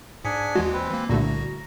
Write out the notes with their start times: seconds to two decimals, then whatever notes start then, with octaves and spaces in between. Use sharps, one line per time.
0.25 G#2 D4 G#4 G#5 B6 C#7
0.55 D#2 E3 G#3 F#4
0.73 C4 B4
0.91 E3 A#3
1.09 C2 A#2 D3 A3 F#4 A#5